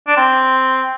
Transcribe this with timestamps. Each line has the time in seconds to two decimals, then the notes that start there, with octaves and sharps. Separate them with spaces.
0.08 D4
0.17 C4